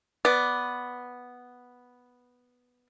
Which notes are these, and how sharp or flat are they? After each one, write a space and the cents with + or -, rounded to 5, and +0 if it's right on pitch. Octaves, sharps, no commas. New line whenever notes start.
B3 +0 D5 +0